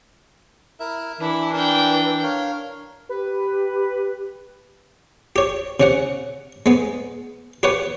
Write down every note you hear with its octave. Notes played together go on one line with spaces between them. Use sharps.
E4 A#4 E5
E3 D4 E4
D4 A#4 G5
A#4 C#5 F5
G4 B4
G4 C#5
C3 C#4 F#5
G#3 B3
G4 B4 C#5 F#5